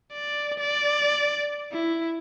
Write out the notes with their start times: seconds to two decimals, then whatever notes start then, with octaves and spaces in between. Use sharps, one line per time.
0.13 D5
0.59 D5
1.72 E4